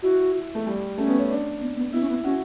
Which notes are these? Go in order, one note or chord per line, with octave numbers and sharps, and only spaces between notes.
E4 F#4
A3
G3
A3 C#4
B3
C#4
D4
B3
B3
B3 E4
C#4
B3
C#4 F#4